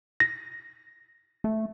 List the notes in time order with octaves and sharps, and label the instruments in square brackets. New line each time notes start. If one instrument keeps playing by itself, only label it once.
[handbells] A#6
[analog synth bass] A3